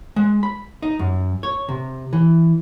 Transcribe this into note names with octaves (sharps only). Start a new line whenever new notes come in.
G#3
B5
D#4
F#2
C#5
C3
E3